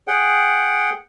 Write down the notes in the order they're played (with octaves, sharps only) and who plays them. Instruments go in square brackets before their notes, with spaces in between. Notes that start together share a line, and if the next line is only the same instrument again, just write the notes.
[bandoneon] G#4 F#5 G5